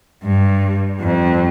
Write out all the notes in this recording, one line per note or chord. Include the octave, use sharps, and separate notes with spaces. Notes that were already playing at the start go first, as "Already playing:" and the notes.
G2
F2